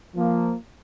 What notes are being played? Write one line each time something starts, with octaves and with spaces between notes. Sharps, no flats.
F3 A#3